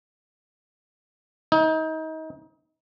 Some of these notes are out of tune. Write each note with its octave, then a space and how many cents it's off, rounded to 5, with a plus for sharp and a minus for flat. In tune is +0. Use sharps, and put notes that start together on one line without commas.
D#4 +30